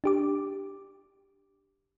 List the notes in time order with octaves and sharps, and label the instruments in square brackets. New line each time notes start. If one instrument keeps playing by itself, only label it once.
[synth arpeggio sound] D4 G4 D6